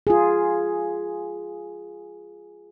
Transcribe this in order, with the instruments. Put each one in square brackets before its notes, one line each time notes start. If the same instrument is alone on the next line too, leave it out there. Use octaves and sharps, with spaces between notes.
[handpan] F4 G#4